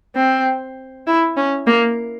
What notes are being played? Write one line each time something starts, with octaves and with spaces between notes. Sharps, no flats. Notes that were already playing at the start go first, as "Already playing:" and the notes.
C4
E4
C#4
A#3